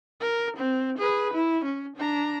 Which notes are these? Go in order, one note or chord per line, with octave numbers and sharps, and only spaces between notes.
A#4
C4
G#4 B4
E4
C#4
D4 A#5